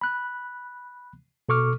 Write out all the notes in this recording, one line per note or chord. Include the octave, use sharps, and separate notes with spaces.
B5 F#6
B2 A4 C#6 D6 F6